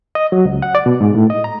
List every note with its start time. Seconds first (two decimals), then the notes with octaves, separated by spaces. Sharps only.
0.15 D#5
0.32 F#3
0.45 C#2
0.62 F#5
0.75 D5
0.86 B2
1.01 G#2
1.15 A2
1.30 D#5
1.44 A#5